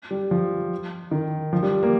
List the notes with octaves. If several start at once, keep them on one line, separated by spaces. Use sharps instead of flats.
G3
F3
D#3
F3
G3
A#3